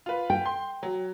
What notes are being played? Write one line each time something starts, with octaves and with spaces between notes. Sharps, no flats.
F4 B4
G5
C6
F#3